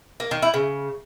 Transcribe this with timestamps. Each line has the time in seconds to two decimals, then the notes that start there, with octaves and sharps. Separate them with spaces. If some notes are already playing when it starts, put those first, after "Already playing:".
0.20 A#3
0.31 D#3
0.42 E4
0.54 C#3